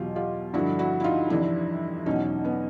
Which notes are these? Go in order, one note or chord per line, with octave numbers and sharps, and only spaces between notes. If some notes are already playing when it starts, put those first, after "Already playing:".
Already playing: E2 B2 F#3 F4 G4
F4 G4
G2 D3 F3 E4 F#4
E4 F#4
E4
D#4 F4
F2 C3 E3 D4 E4
E2 B2 F#3 C#4 D#4
B3 C#4